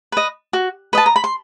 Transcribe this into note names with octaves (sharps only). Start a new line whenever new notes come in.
B4 D#5
F#4
B4 D#5 A5
A#5
B5
C6